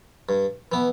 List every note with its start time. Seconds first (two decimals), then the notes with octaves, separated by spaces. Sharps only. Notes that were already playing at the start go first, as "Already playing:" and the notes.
0.29 G2
0.72 E3 B3